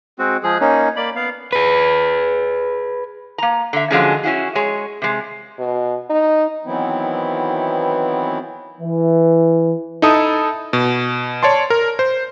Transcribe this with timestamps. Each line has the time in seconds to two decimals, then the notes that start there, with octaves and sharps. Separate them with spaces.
0.19 G#3 C4 F#4
0.43 F3 G#3 G#4
0.61 A#3 C#4 D#4
0.96 A#3 D5 B5
1.16 B3 F5
1.53 G#4 B4
3.38 A#3 A#5
3.73 D3 E5
3.91 D3 F3 F#3 G#3 C4 C#4
4.23 C#4 E4 F#4 G#4
4.55 G#3 G#4 C#5
5.02 C3 G#3
5.59 B2
6.10 D#4
6.65 D#3 E3 F#3 B3 C4 E4
8.81 E3
10.02 D#4 E4 A4 A5 D#6
10.73 B2
11.43 C#5 D5 A5 C6
11.70 A#4
11.99 C5